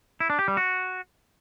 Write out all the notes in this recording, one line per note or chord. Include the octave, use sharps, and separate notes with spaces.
E4
D4
G4
G3
F#4